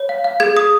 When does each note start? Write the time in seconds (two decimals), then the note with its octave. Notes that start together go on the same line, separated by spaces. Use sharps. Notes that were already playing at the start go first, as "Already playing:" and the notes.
Already playing: C#5
0.09 F5
0.24 F5
0.40 G#4 G#6
0.57 G#4 D#6